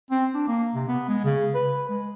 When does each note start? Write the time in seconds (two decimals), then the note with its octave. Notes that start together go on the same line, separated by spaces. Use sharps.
0.11 C4
0.34 D4
0.47 A#3
0.75 C3
0.88 B3
1.09 G#3
1.24 C#3
1.55 B4
1.89 G#3